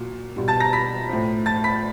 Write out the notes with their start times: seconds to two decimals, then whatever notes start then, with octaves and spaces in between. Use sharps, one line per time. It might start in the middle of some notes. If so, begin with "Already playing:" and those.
Already playing: A#2 F#3
0.36 B2 G3
0.48 A5 A6
0.60 A#5 A#6
0.73 B5 B6
1.09 A2 F3
1.46 A5 A6
1.64 B5 B6